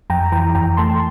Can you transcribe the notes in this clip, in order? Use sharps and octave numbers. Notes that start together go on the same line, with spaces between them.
F2 G5 A#5
E3 G5 A#5
F2 G5 A#5
A3 A5 C6
A5